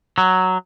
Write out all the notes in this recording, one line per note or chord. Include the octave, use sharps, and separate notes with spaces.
F#3